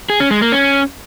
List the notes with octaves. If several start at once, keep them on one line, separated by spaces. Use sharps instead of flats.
G#4
C#4
G#3
A#3
C#4